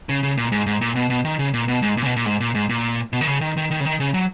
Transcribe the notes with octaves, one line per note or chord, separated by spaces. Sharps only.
C#3
C#3
A#2
G#2
G#2
A#2
B2
B2
D#3
C#3
A#2
B2
G#2
A#2
C#3
B2
A#2
G#2
A#2
G#2
A#2
B2
D#3
C#3
D#3
D#3
D#3
C#3
D#3
C#3
F#3